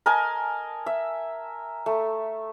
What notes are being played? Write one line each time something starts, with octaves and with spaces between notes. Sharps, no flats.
A#4 D#5 G#5 A5
E5
A3